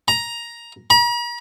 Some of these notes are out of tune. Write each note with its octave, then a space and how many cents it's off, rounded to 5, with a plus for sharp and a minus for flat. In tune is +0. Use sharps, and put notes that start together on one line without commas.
A#5 +10
A#5 +45